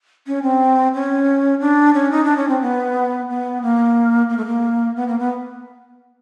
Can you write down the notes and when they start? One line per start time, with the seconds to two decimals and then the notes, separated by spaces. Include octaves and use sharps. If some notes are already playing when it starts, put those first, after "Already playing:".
0.27 C#4
0.43 C4
0.94 C#4
1.60 D4
1.94 C#4
2.11 D#4
2.24 D4
2.37 C#4
2.48 C4
2.61 B3
3.29 B3
3.62 A#3
4.29 A#3
4.37 A3
4.46 A#3
4.96 B3
5.08 A#3
5.19 B3